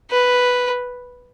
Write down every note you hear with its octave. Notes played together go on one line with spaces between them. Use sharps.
B4